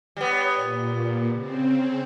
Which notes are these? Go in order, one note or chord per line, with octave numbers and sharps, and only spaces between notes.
G3 B3 C#5
A#2
C#3 C4